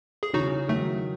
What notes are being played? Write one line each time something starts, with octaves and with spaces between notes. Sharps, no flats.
G#4
C#3 E3 D#4 F#4
D#3 F#3 A3